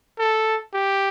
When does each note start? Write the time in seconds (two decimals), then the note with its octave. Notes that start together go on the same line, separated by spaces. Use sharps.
0.19 A4
0.73 G4